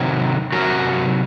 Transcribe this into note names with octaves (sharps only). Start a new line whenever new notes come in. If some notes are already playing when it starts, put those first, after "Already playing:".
Already playing: C3 D#3 F#3
C3 D#3 F#3 F#4 A#4